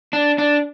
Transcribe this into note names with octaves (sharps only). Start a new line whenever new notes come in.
D4
D4